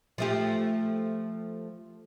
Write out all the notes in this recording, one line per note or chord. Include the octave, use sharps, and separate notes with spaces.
F3 A3 G4